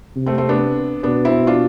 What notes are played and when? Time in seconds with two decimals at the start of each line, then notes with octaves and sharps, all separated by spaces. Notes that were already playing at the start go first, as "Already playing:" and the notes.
0.16 C3
0.26 A3 C4
0.38 A3 C4
0.49 B3 D4
1.03 B2 B3 D4
1.25 C4 E4
1.47 D4 F4